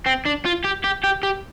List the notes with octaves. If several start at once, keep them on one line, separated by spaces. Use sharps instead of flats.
C4
D4
F4
G4
G4
G4
G4